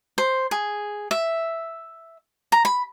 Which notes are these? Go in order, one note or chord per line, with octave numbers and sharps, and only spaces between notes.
C5
G#4
E5
A#5
B5